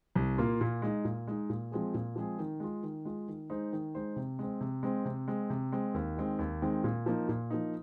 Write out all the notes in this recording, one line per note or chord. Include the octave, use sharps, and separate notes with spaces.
C2
A#2 A#3 F4
A#2
G#3 D#4
A#2
G#3 D#4
A#2
F3 G#3 C4 G#4
A#2
F3 G#3 C4 G#4
D#3
G#3 F4
D#3
G#3 F4
D#3
G#3 D#4 C5
D#3
G#3 D#4 C5
C3
G#3 C4
C3
G#3 C4
C3
G#3 C4
C3
G#3 C4
D#2
D#3 G#3 C4
D#2
D#3 G#3 C4
A#2
F3 A#3 D#4
A#2
F3 A#3 D#4